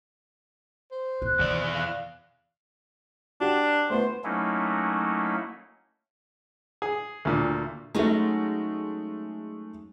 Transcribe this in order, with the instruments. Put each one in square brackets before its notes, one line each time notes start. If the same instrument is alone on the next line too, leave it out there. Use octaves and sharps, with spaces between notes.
[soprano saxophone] C5
[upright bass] B1 G#2 [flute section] F#6
[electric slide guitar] E2 D5 [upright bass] B2 D#3
[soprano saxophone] F5
[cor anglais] D4 [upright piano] F#4 G4
[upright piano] A3 B3 [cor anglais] C5
[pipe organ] F#3 A3 A#3 C#4 D#4 E4
[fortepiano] G#4
D2 A#2
[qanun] F#3 C#4 D#4 [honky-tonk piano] G#3 A3